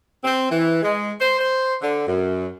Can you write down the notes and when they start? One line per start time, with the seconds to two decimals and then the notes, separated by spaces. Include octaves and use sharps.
0.24 C4
0.49 E3
0.82 G#3
1.19 C5
1.38 C5
1.81 D3
2.06 F#2